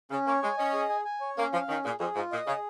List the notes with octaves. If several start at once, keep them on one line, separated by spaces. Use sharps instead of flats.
C#3 C#4
A#3 C#5
G#3 G#5
C#4 D#5
G#4
G#5
G#5
C#5
A#3 C#4
F3 F5
D#3 C#4
A#2 G#4
F2 G#4
G#2 F4
A#2 D#5
C#3 G#4